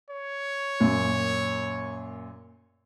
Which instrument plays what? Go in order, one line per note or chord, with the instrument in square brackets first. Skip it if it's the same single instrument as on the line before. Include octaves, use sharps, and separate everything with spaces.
[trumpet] C#5
[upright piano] F#2 A#2